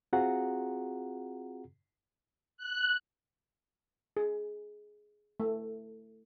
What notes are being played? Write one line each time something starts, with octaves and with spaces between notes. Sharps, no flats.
C4 F4 F#4 G#4 F#5 A#5
F#6
G#4
A3